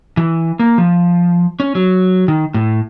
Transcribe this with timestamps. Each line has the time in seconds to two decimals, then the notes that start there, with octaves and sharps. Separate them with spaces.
0.17 E3
0.60 A#3
0.78 F3
1.60 C#4
1.75 F#3
2.28 D#3
2.54 A2